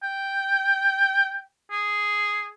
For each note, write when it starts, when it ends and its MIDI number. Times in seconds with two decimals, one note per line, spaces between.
0.03 1.43 79
1.71 2.50 68